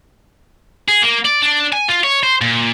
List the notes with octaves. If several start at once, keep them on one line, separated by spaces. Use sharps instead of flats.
G#4
A#3
D5
D4
G#5
F4
C#5
C5
A#2